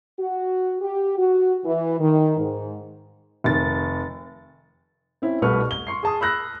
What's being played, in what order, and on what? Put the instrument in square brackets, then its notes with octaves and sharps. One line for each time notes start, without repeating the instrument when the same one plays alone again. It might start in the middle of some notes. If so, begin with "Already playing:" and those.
[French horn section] F#4
G4
F#4
E3
D#3
G#2
[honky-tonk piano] F1 D#3 A6
[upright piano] C4 C#4 E4
C2 B2 A3 B4 C#6 F6
G7
C6 C#6 C7
G#4 A5 D#6
B5 E6 F#6 A#6